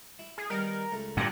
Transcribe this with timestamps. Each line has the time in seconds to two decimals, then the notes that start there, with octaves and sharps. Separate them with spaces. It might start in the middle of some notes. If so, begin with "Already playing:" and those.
0.19 E4
0.38 G#4
0.50 D#3 G3 B3 A#4
0.92 C#2 A3
1.17 G2 A#2 F#5